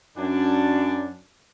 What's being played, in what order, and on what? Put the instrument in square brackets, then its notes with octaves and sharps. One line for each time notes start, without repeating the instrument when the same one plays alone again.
[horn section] F#2 D4